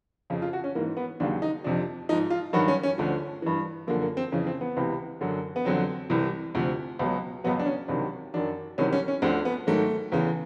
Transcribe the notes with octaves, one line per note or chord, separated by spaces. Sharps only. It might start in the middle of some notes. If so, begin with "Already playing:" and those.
F2 C#3 F3
F4
F#4
C#4
G#2 E3 A#3
B3
D#2 C#3 F#3 D4
D#4
F2 C3 F3 D4
G#2 F3 D#4
F4
G2 D#3 F#3 F#4
C#4
C#4
D2 D3 F3
G2 E3
F#2 D3 F3 A#3
A#3
C4
F2 C#3 E3 C#4
C4
B3
C#2 C3 E3
F#2 D3 F#3
B3
F2 D3 F#3 C4
C2 C3 E3
D2 C3 F3
C#2 B2 F#3
C#2 B2 F#3 B3
D4
C#4
C#2 C3 D#3 F#3 D4
F#2 D#3 F#3 D4
C2 C3 D#3 F#3 C#4
C#4
C#4
D2 D3 F3 C4
B3
G#2 D#3 F#3 A3
E2 C#3 E3